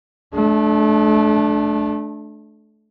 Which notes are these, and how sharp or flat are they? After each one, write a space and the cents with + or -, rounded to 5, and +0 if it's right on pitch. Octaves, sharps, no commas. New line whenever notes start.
A3 -30 D4 +0